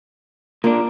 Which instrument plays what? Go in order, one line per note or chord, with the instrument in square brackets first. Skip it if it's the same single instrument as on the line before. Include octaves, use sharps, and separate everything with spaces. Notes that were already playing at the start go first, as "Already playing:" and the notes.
[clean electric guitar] A#2 D4 [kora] A#3